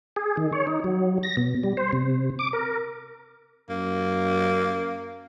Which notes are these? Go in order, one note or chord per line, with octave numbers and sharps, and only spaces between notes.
G#4
D#3
C#5
D#4
F#3
A#6
B2
G3
C5
C3
D6
A#4
F#2 A#3